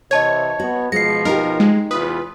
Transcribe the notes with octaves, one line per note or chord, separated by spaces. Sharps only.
C3 E3 C5 C#5 D#5 A5 G#6
B3 F#4
B2 F3 G#3 A#6 C7 C#7
D#4 G4 A#4
G#3
E2 C3 F4 B4 D#6